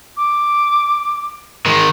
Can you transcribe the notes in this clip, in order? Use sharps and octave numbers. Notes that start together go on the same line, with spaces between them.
D6
D#3 G#3